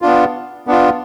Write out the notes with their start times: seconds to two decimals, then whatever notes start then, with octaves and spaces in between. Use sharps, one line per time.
0.02 B3 D4 F4
0.67 B3 D4 F4